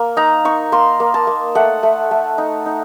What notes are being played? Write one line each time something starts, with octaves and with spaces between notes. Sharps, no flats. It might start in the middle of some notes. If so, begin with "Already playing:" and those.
Already playing: A#3
D#4 A#5
D#4 C#6
A#3 C6
A#3
A5
A#3
A3 F#5
A3
A3
D#4
D#4